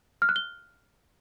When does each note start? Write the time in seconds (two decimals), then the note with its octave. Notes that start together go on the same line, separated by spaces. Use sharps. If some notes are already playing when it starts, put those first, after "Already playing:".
0.22 F6
0.29 F#6
0.36 G7